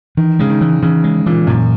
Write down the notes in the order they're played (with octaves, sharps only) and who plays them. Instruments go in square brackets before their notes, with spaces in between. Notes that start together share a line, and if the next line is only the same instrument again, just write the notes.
[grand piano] D#3 [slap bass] E3
[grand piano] C#3 [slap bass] G#3
[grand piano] D#3
[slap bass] E3
[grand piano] C#3 [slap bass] E3
[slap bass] G#3
[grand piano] A#2 [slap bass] E3
[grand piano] F#2 [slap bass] A#2